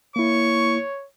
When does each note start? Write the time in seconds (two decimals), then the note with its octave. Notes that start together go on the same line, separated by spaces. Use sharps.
0.16 A#3 E4 C#5 C#6